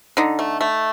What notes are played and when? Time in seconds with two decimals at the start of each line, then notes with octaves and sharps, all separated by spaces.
0.17 D3 D#4
0.39 A3
0.61 A3